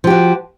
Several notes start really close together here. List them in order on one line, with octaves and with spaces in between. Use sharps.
F3 G4 F#4